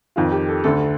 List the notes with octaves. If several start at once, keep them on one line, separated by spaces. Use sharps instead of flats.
F2 D#3 F4
G4
A4
D2 D3 A4